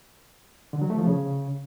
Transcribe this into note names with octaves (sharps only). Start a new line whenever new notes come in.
D3
F#3
A3
F3
C#3